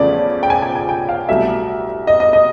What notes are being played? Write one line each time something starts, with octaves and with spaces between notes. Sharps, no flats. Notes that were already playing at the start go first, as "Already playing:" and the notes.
Already playing: E2 C#3 F3 A3 C#4 D5
G5
G#5
G#5
G#5
G5
F5
C2 B2 F#3 A3 E5
D#5
D#5
D#5